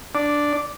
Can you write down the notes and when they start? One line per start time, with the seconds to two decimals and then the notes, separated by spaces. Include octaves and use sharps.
0.15 D4